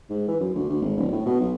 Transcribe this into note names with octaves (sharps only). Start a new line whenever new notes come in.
G#2
E3
F#2
D2
D2
G#1
D1
A2
B2
B1